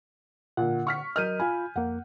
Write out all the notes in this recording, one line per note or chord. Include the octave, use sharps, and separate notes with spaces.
A#2 D3 F#5
C#6 F6 B6
F#3 A#4 D#5 F6 G6 D#7
F4 G#5 B5
F2 A#3 F#5